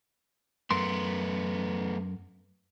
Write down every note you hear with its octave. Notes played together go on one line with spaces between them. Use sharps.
F#2 A3 B3 A#4 C6